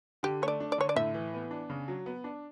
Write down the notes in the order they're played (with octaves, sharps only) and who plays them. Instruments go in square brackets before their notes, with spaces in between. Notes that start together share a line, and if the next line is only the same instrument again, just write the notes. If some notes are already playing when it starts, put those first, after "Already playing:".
[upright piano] D3 [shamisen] G4
[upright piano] A3 [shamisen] C#5
[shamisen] D5
[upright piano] D4
[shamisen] D5
[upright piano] D3 [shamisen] C#5
[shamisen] D5
[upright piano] A2 [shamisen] E5
[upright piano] E3
B3
D4
C#3
F#3
B3
D4